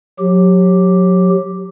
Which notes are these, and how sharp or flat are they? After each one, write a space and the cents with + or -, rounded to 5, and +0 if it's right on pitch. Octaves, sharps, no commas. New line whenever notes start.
F#3 -25 G4 +0